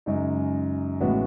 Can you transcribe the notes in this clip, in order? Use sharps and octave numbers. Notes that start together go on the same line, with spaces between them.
F#2 C#3 G#3 D#4
A1 A2 G#3 B3 F#4